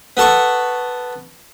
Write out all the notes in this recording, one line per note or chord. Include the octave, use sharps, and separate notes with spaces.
B3 A4 C#6